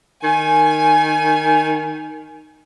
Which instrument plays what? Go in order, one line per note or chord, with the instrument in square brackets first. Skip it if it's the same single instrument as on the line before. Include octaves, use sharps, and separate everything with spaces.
[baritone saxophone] D#3 [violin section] G#5